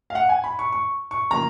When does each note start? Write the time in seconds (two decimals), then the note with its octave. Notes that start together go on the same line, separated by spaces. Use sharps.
0.10 F5
0.15 F#5
0.29 G#5
0.44 B5
0.59 C#6
0.72 C#6
1.11 C#6
1.31 C#3 F3 A#3 F4 A#5